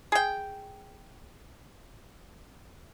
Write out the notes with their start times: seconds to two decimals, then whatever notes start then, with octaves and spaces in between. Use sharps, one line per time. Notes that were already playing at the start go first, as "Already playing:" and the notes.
0.12 G#4 G5